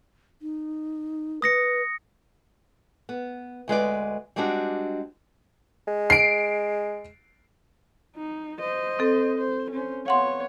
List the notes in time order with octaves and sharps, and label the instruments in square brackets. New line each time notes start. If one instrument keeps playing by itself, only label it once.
[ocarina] D#4
[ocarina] B4 [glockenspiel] D#6 A#6 C#7
[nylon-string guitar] B3
D2 G#3 B4 D5
G3 G#3 C4 D4 F#4
[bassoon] G#3
[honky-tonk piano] C7 D7
[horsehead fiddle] D#4
C5 D#5
[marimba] C4 A4
[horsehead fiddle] C5
C#4 C5
[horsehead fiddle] B3 C#5 [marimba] F5 F#5 C6